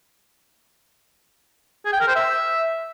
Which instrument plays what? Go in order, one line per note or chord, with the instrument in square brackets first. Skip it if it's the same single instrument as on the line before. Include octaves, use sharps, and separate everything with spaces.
[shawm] G#4
G5
A#4
C5
E5